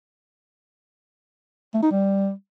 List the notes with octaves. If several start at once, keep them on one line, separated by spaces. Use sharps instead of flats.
A3
D#4
G3